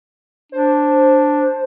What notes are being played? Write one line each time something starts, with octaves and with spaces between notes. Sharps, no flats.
D4 C5